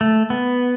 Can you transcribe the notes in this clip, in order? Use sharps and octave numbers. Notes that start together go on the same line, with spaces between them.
A3
B3